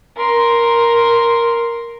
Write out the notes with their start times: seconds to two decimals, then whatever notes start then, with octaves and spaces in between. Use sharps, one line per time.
0.17 A#4 C6